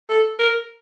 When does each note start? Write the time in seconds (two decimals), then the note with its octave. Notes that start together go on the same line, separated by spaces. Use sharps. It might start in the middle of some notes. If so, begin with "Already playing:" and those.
0.10 A4
0.39 A#4